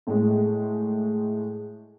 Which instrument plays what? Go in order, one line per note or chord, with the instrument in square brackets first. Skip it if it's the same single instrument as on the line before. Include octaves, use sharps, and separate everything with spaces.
[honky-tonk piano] A2 G#3